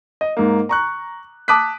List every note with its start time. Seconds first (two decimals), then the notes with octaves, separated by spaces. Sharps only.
0.21 D#5
0.37 G#2 A#3
0.69 A#5 C#6 F#6
1.48 A5 D6 D#6 F#6 B6